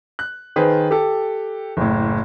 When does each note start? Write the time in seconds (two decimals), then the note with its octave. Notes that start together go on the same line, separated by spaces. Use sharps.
0.19 F#6
0.56 D#3 G#4 B4 C5
0.91 G4 A4
1.77 F#1 A2